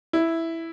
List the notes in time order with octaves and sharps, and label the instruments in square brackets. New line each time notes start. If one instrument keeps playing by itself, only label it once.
[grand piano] E4